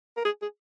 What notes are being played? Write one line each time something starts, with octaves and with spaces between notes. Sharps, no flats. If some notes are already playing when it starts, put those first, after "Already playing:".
A#4
G#4
G#4